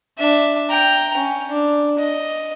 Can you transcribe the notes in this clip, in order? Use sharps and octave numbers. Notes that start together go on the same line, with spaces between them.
D4 E5
G5 A#5
C#4
D4
D#5